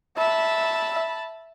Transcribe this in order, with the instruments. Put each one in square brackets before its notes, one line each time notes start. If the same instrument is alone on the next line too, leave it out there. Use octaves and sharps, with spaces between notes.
[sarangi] E5 [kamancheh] A5 B5